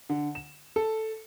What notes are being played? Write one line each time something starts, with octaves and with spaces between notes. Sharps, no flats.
D3
E7
A4